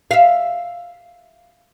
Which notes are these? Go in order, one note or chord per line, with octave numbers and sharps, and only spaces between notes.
E5 F5